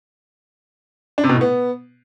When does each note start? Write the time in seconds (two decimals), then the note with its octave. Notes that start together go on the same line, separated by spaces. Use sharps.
1.18 D4
1.24 C3
1.29 B2
1.35 A2
1.41 B3